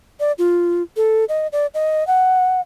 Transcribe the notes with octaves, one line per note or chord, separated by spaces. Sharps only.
D5
F4
A4
D#5
D5
D#5
F#5